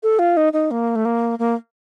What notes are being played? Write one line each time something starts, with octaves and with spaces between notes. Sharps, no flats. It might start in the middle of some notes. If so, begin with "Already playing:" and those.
A4
F4
D#4
D#4
A#3
A3
A#3
A#3